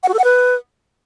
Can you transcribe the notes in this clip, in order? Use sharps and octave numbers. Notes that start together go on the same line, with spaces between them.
F#5
F#4
A4
F#5
B4